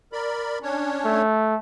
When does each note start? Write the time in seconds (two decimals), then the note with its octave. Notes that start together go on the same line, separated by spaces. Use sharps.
0.13 A#4 D5 B5
0.62 C#4 D4 C#5
1.05 A3